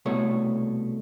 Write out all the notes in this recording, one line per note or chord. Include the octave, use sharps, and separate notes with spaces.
C2 B2 A3 C#5